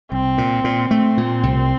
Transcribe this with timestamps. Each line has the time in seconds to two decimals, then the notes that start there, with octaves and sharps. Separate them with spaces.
0.11 C2 C4
0.38 A#2
0.64 A#2
0.90 A3 C4
1.17 A#2
1.43 C2